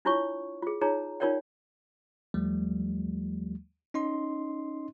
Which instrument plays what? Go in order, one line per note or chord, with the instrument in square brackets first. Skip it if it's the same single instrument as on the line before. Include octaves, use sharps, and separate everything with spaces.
[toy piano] D4 E4 F4 C#5 C#6
F4 G#4
D#4 F4 G#4 C#5 A#5
D#4 F4 A#4 C#5 D5 G5
[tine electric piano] D#2 F3 G3 A3
C#4 D#4 D#5 C6